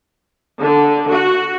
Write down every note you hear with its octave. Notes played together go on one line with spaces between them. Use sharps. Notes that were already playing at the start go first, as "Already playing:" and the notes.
D3
F#4